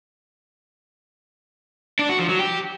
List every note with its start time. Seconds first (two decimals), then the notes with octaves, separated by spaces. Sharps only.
1.99 D4
2.09 F#4
2.19 F3
2.29 F#3
2.39 G4